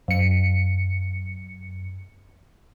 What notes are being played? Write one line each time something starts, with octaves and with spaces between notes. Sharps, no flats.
F#2 C#7